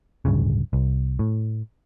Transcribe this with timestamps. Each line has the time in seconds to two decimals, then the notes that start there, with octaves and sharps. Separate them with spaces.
0.25 D1 A#1 G2 C#3
0.73 C2
1.19 A2